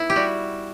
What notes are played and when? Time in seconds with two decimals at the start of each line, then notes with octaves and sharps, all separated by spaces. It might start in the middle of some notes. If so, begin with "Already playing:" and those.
Already playing: B3 E4
0.10 G4
0.16 G3 F#4